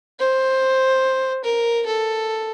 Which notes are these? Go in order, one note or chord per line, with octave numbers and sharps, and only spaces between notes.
C5
A#4
A4